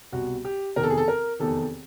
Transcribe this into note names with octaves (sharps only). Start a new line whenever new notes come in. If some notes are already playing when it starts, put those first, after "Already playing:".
C2 B2 F#4
G4
F1 E2 C3 D#3 A#4
A4
G#4
A4
A#4
F1 E2 C3 D#3 A4